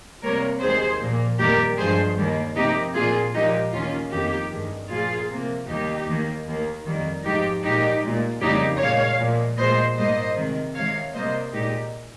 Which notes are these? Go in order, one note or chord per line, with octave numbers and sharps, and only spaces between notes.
C3 G3 A#3 A#4 C#5
D#2 D#3 G#3 G#4 C5
A#2 F3 A#3
F2 D#3 G3 A#3 G4 A#4
G2 F3 G#3 G#4 C5
D#2 D#3 G3 A#3
C3 F3 A#3 D#4 G4
A#2 F3 A#3 F4 G#4
A#2 F3 G#3 D#4 G4
D#2 D#3 A#3 C#4 F4
F2 D#3 A#3 D#4 G4
G2 D#3 G#3
A#2 F3 A#3 F4 G#4
C3 F3 A#3
D#2 D#3 G3 A#3 D#4 G4
D#2 D#3 A#3
D#2 D#3 A#3
F2 D#3 G3 A#3
G#2 F3 G#3 D#4 G4
A#2 F3 G#3 D#4 G4
A#2 G#3
F2 C#3 G3 A#3 D#4 G4
A#2 G#3 C#5 F5
A#2 F3 G#3
A#2 G#3 C5 D#5
G#2 G3 A#3 C5 D#5
C3 D#3 G#3
C3 D#3 G#3 C#5 F5
C3 G3 A#3 C5 D#5
A#2 G#3 D#4 G4